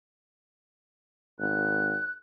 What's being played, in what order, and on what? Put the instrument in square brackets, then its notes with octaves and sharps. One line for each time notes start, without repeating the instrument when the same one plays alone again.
[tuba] G#1 [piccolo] F#6